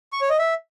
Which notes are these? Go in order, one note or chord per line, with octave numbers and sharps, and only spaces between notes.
C#6
C#5
D#5
E5